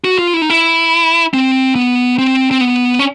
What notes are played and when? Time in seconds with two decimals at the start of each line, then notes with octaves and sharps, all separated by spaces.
0.05 F#4
0.19 F4
0.34 E4
0.42 D#4
0.50 E4
1.34 C4
1.75 B3
2.18 C4
2.51 C4
2.61 B3
2.99 C#4